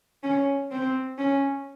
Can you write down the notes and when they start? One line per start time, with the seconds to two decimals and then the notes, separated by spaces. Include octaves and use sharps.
0.23 C#4
0.71 C4
1.18 C#4